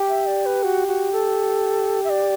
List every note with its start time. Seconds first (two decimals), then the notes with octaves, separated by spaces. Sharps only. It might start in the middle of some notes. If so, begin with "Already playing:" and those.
Already playing: G4
0.09 E5
0.26 D5
0.46 B4
0.63 F#4
0.88 F#4
1.13 A4
2.04 E5
2.10 D5